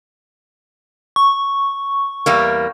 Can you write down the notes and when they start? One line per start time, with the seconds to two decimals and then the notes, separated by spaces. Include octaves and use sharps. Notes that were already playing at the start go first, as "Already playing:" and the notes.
1.16 C#6
2.26 E2 G3 A#3